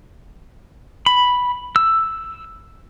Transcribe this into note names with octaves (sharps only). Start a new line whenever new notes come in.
B5
E6